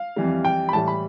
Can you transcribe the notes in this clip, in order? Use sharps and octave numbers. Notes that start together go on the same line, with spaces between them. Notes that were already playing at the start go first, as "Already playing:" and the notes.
Already playing: F5
F2 E3 G3
G5
B5
A2 E3 G3 A5
B5